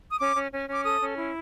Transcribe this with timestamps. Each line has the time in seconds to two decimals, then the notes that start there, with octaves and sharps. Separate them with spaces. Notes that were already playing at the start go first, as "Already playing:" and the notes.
0.11 D#6
0.20 C#4 D6
0.35 C#4
0.51 C#4
0.68 C#4 D6
0.84 A4 D#6
1.01 C#4
1.16 E4